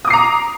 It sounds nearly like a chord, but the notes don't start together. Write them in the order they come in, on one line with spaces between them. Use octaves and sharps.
D#6 D6 C7 A#5